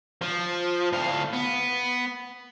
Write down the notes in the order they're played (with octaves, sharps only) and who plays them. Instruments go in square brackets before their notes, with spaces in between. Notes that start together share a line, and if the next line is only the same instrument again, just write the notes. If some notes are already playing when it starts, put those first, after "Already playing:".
[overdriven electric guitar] F3
A2 F5
B3